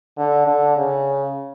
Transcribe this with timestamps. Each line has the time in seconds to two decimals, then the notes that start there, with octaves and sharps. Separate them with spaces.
0.18 D3
0.47 D3
0.76 C#3